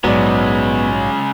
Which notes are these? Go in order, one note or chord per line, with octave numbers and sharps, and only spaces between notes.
A#1 G#2 C#3 F#3 G#3 B3 D5